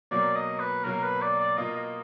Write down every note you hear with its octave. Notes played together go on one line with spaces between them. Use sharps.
B2 F#3 A#3 D5
D#5
B4
B2 F#3 A#3 A#4
B4
D5
D5
B2 A#3 F4 D#5
D#5